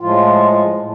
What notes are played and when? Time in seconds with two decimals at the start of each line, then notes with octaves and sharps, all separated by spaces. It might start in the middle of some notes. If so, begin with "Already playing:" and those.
0.01 A2 F3 G#3 F4
0.79 A2